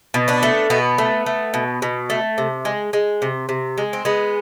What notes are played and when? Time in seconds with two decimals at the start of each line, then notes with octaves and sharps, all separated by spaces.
0.14 B2
0.28 B3 D4
0.43 A3
0.70 B2 B3
0.98 A3
1.26 A3
1.54 B2
1.82 B2
2.10 A3
2.38 C3
2.65 G#3
2.93 G#3
3.22 C3
3.49 C3
3.78 G#3
3.93 C4
4.05 G#3 B3